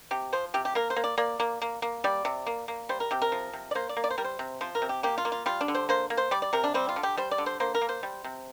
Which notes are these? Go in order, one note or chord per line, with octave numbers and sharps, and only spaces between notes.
C3 G4
F3 C5
C3 G4
G4
A#3 A#4
C5
A#3
D5
A#3 D5
A#3
A#3
A#3
G3 D5
C3
A#3
A#3
G3 C5
A#4
C3 G4
A#4
F3
C3
D5
A#3 C5
D5
A#3
D5
C5
G3 A#4
C5
C3
F3 C5
A#4
C3
G4
A#3 G4
F4
A#3
F4
G3 F4
D4
D3
C5
A#3 C5
A#3
C5
G3 D5
D5
C3 A#4
D4
G3 C4
F4
D3
G4
G3 C5
D5
D3
C5
A#3 C5
A#4
A#3
C5
G3
C3